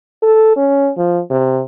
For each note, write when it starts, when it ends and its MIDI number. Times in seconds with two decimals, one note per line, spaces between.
0.23 0.55 69
0.56 0.90 61
0.97 1.20 53
1.30 1.62 48